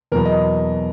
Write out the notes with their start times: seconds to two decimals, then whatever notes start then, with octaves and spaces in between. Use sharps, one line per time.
0.12 E2 B2 F#3 B3 A#4
0.25 D#5